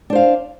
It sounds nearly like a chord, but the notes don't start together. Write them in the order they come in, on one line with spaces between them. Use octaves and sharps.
D4 C5 F5